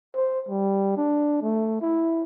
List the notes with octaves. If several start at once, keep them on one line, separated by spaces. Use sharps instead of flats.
C5
G3
D4
A3
E4